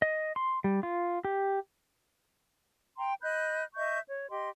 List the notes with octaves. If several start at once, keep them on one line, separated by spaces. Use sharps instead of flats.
D#5
C6
G3
F4
G4
G5 A#5 C6
D#5 B5 F#6 G6
D#5 E5 C#6 G6
C#5
G4 D#5 C6